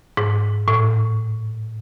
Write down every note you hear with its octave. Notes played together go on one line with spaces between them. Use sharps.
G#2
A2